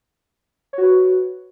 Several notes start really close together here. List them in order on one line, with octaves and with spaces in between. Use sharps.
C#5 F#4 B4